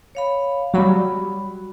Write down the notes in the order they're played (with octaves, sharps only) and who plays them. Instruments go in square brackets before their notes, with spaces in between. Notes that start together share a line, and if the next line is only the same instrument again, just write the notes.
[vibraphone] C#5 F5 B5
[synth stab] F#3 G3 [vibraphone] F#4 B5